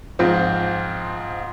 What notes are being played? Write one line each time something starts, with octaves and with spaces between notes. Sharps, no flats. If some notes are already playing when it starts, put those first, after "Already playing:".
G#2 F3 C4 F4